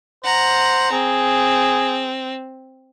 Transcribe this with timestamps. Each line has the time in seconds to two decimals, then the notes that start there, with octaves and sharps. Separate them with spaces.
0.24 C5 F#5 A#5
0.92 C4 G#4